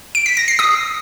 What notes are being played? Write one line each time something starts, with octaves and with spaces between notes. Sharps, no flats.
D7
B6
A#6
C7
D#6